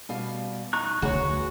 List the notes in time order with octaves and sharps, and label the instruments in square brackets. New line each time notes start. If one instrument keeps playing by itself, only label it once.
[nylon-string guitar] B2 G3 F5
[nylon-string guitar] D#4 [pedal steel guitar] A#5 C#6 F#6
[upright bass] D2 D3 [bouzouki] F#4 [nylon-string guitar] G#4 B4 C#5